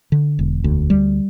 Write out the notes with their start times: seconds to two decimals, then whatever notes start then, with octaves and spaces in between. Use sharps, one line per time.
0.12 D3
0.39 E1
0.64 D2
0.90 G3